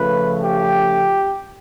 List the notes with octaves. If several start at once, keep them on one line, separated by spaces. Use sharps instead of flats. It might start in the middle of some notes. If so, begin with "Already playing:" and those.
Already playing: C#3 F3 A3 B4
G4